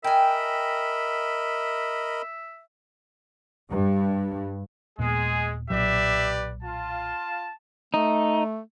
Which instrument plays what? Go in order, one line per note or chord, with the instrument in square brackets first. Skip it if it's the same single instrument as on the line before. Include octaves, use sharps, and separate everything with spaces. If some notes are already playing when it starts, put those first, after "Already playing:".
[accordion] A#4 D#5 B5 [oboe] E5 [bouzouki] G5 G#5
[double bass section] G2
[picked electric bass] D#1 A#2 B3 [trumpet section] G#3 [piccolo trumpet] G#4
[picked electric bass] B1 A#2 F#3 [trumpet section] G4 B4 D5 [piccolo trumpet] E5
[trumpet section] F4 [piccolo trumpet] A5
[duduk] A3 [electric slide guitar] D#4